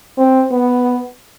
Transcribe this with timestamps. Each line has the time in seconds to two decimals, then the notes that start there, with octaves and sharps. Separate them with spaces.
0.18 C4
0.52 B3